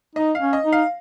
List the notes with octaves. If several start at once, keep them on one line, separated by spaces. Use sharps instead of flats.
D#4 D#5
F5
C#4
D#5
D#4
F5